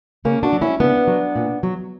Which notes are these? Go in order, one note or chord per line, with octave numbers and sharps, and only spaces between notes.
C#3 A#3 C#4
D4 F#4
F#3
C#4 E4
C#3 B3 D4
F#3
A#2
F#3